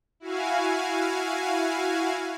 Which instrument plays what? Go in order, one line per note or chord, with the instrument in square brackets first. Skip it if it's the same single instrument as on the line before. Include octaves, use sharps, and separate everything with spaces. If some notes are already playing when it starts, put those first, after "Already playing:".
[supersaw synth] E4 F#4 F5 G#5